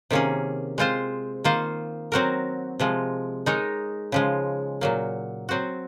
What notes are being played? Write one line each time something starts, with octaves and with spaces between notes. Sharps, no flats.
C3 D#3 A#3 C#4 G#4
G#3 C4 F4 C5
D#3 A#3 F4 C5
F#3 C4 F#4 A#4
C3 F3 G#3
G#3 D#4 A#4 C#5
C#3 F3 G#3
A#2 F#3 A#3
F#3 C4 F#4